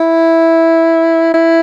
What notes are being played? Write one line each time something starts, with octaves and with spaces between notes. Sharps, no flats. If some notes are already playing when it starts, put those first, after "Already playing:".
Already playing: E4
E4